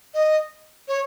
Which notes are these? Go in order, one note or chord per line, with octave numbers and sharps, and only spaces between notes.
D#5
C#5